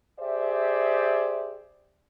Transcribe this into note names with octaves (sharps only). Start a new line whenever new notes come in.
G4 G#4 C5 D5 E5